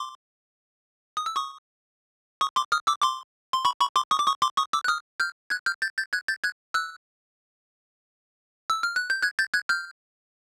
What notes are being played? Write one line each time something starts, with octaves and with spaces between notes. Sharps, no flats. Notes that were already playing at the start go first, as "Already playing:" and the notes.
Already playing: C6 D6
D#6
E6
C#6 D#6
C#6 D#6
C6 D6
D#6 F6
D6 E6
C6 D6
C6
B5 C#6
B5 C#6
C6 D6
C#6 D#6
D6
C#6 D#6
C6 D6
C#6 D#6
D6 E6
F#6
D#6 F6
F6 G6
F#6 G#6
F6 G6
G6 A6
G6 A6
F#6 G#6
G6 A6
F#6 G#6
E6 F#6
E6
F6
F#6
G6
F#6 G#6
G6 A6
F#6 G#6
F6 G6